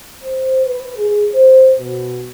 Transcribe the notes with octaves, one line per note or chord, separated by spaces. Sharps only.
C5
B4
G#4
C5
B2